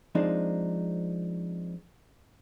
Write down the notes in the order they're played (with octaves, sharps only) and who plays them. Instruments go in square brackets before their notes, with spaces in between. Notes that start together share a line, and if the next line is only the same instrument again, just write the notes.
[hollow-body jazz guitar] F3 G#3 C4 D4 D#4